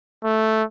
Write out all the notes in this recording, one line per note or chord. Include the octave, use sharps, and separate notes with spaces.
A3